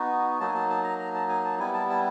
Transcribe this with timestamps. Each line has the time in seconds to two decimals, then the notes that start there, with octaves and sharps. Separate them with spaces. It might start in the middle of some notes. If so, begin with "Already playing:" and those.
Already playing: B3 D#4 F#4
0.40 F#3 A#3 D#4 A5
0.48 G#5
0.54 A5
0.70 A5
0.84 A#5
0.99 A#5
1.14 A5
1.29 G#5
1.45 A5
1.59 G3 B3 E4 G#5
1.74 A5
1.90 A5